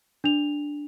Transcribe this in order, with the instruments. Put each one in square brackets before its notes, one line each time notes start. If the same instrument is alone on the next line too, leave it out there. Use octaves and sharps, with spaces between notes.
[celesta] D4 F7